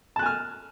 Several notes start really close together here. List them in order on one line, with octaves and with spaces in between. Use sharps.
A5 F#6 G#5 F6